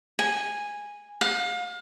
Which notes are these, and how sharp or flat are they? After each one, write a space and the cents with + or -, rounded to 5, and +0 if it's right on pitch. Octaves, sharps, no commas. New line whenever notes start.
G#5 -10
F5 +35